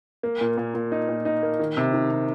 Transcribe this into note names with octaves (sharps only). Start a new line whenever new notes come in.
A#3
A#2
A#2
A#2
D#4
A#2
D#4
A#3
D#3
C3
D#3
C3